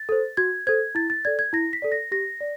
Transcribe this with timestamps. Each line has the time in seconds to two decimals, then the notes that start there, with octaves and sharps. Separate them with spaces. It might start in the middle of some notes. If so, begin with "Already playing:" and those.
Already playing: A6
0.09 A4 C5
0.37 F#4 G#6
0.67 A4 C5 G#6
0.95 E4 A6
1.10 A6
1.25 A4 D5 G#6
1.39 G#6
1.53 E4 A#6
1.73 B6
1.82 A4 D5
1.92 A#6
2.12 G4 A#6
2.41 D5